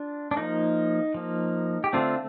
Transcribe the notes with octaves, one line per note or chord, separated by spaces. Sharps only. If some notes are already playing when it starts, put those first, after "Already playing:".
Already playing: D4 F4
D4
F3 A#3 D#4
F3 A#3
G4
D3 A3 C4 D4 F4